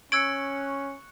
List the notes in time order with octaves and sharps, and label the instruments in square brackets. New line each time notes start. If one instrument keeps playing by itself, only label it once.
[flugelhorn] C#4 [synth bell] C#6 F#6 C#7 [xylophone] E6 G#6 D7